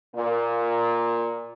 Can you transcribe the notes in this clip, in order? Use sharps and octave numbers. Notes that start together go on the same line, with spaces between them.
A#2